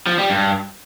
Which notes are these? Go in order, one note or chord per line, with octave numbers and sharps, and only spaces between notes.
F3
G3
G2